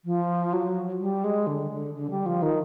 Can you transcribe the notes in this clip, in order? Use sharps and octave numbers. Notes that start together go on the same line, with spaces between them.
F3
F#3
G3
G#3
D3
D3
D3
G3
F3
D#3